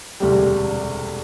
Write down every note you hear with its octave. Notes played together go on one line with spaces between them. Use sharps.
E1 D2 C3 G3